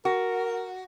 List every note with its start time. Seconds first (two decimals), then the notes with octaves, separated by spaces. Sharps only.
0.05 F#4 A#4